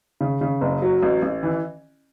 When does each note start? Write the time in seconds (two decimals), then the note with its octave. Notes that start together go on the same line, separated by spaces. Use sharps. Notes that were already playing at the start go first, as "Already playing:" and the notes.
0.21 C#3
0.41 C#3
0.61 F#1
0.82 F#3
1.03 A1
1.22 A1
1.43 E3